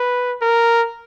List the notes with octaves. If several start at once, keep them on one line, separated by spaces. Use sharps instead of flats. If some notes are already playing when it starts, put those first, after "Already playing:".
Already playing: B4
A#4